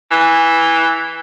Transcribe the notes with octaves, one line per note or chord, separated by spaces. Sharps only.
E3